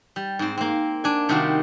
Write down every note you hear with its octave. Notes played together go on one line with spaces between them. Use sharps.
G3
G#2 C4
A#3 C4
D4 G#5
C3 D#3 G3 C4 F4 F#4